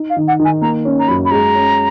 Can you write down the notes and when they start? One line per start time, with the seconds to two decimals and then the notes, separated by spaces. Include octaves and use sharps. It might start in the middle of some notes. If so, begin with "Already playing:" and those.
Already playing: D#4
0.10 F5
0.16 D#3
0.28 F#5
0.39 D#3
0.45 G#5
0.61 A#3 A#5
0.85 C#4
0.99 A#5
1.08 F#2 B5
1.25 B5
1.31 G#3 A#5
1.55 C#4